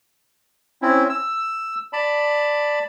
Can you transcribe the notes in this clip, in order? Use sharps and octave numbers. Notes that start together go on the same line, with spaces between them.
C4 C#4 E4
E6
D5 A5 B5